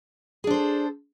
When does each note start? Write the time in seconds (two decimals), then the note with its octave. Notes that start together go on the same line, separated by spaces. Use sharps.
0.44 G#4
0.47 D4
0.50 C5
0.54 A4